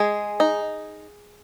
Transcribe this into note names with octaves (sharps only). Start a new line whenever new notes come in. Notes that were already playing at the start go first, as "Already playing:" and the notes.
Already playing: G#3 G#4
D#4